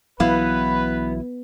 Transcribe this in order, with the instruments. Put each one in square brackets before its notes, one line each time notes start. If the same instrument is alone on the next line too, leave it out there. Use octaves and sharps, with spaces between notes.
[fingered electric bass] B1 E3 F#3 [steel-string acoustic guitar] B3 [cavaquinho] E4 F5 [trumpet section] B4